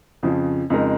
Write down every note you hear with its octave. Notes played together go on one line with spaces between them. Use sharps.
F2 C#3 F3
F2 C#3 G#3 D#4 A#4